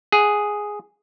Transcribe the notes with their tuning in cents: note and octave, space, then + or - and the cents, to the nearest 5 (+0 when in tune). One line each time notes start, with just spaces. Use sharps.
G#4 +0 F#5 +0